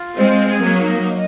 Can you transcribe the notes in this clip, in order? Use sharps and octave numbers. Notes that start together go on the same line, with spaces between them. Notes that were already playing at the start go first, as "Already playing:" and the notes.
Already playing: F4
G#3 C4 D#5
G#4
F#3 A#3
D#4
D#5